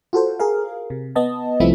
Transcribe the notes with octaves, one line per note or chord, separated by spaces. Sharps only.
F4 F#4 A4 C5
G#4 A#4 F5
C3
B3 D#5 A5
C2 F3 A3 C4 E4 B5